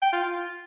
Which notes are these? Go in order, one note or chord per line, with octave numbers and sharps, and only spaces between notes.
G5
F4
F4